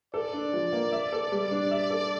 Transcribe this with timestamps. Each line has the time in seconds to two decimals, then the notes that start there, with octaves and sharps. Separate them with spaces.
0.14 A4 D5
0.33 D4
0.53 F3
0.73 A#3
0.92 E5
1.12 A4
1.32 G3
1.51 D4
1.71 E5
1.90 A4